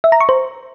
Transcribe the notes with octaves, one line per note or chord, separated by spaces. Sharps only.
E5
A#5
C#6
C5